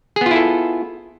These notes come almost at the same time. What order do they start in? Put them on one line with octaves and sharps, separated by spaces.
G#4 B3 F4 E4 A4